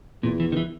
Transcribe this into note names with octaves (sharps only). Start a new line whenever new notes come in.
E2 A#2
E3
D#3
E3